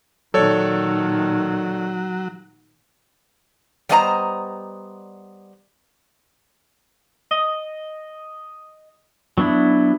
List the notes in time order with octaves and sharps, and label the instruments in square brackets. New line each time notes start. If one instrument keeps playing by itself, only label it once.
[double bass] A#2 D#3 [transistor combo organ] F#3 [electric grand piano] A4 C#5 D5
[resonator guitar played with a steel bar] G3 B3 C5 D#5 G#5 A#5
[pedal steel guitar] D#5
F#3 B3 D4 E4